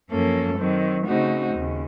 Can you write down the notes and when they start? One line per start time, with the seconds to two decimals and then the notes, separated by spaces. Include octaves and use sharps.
0.10 F#2 F3 A#3 C#4 A4
0.58 D#3 F#3 C4
1.07 C#3 A3 C4 D#4 F#4
1.56 D#2 C#3